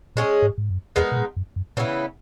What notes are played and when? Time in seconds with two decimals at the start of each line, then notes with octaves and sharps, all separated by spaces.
0.16 A#2 G#3 C#4 G#4
0.42 G#2
0.58 G#2
0.70 F#2
0.96 E2 G#3 B3 D#4 A#4
1.12 B2
1.16 A#2
1.37 F#2
1.56 F#2
1.77 A#2 C#3 E3 B3 E4